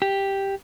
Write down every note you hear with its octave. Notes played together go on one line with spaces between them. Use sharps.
G4